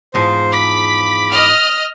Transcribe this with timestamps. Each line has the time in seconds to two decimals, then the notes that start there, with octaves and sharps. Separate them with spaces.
0.14 E2 G#2 F3 C5
0.52 B5 D6 B6
1.31 D#5 F6